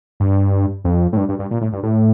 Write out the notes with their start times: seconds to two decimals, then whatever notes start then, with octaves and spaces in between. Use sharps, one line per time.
0.20 G2
0.84 F2
1.13 A2
1.17 G2
1.29 G2
1.39 G2
1.51 A#2
1.61 A2
1.73 G2
1.83 A2